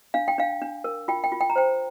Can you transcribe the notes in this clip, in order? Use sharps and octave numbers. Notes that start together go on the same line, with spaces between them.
D4 F5
G5
D4 F5
D4
A#4
F4 G5
G5
F4
G5
A#5
C5 G5